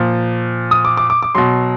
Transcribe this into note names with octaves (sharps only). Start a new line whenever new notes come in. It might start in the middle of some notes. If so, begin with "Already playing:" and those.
Already playing: A#2 F3
D#6
D6
D6
D6
D6
B2 F#3 C6